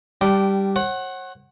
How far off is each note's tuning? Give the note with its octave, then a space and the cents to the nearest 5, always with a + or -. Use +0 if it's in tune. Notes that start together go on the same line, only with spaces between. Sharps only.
G3 +0 D4 +0 G5 -20
C#5 -45 F#5 +10